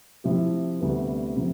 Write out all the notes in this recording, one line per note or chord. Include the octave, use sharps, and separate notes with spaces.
C3 F3 C4 E4 G4
D2 C3 G3 B3
C3 F3 C4